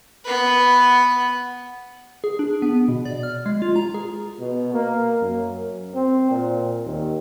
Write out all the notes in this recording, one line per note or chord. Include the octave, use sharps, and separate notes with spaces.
B3 B4
G#4
D4
B3
B2
D5
F6
G#3
F4
A#5
G#4
B2
A#3
F#2
C4
A#2
D#2